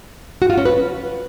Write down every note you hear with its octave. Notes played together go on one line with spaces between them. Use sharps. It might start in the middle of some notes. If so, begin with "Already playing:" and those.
F#4
F4
C#4
B4